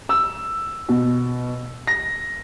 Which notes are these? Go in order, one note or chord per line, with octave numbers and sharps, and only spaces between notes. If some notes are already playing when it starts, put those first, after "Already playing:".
E6
B2
A#6